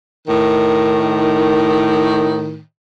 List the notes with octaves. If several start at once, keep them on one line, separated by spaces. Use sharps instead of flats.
A2 D#3